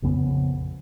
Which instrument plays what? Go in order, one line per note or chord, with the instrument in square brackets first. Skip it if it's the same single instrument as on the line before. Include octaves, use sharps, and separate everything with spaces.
[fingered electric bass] A#1 F2 C#3 B3